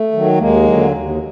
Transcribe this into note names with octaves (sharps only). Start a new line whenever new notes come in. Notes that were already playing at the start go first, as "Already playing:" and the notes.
Already playing: A3
D#3 F#3
D#2 G#3 A#3
D3 F#3
D#2